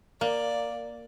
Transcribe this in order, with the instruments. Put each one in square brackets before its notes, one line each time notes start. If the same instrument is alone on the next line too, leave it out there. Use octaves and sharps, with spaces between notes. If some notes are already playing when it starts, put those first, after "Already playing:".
[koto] A#3 [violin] D5